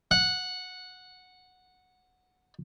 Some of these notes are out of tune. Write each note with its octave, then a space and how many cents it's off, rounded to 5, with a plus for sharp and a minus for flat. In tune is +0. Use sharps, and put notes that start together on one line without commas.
F#5 -10